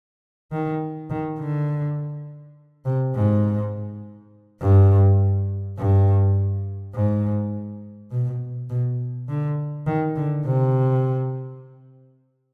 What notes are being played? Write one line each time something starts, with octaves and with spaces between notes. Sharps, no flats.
D#3
D#3
D3
C3
G#2
G2
G2
G#2
B2
B2
D3
D#3
D3
C3